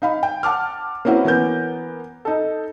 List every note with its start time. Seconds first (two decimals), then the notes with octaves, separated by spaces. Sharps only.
0.02 D#4 F5 B5
0.23 G5
0.43 F#5 A5 D6 F6
1.05 A#3 C4 C#4 E4 F#4 B4
1.25 E3 B3 A#4 G6
2.25 D#4 A4